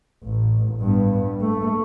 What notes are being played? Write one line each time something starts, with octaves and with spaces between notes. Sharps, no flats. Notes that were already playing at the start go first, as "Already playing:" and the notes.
A1
G2 B3
A3